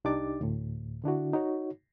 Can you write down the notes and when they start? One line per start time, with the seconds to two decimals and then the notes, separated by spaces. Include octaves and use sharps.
0.05 C2 D4 D#4 G4 D6 A6
0.41 D2 A2
1.04 D3 D4 E4 F#4
1.33 D#4 F#4 C#5